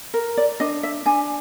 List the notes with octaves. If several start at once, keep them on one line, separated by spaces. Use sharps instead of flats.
A#4
D5
D4 D#5
E5
D4 G#5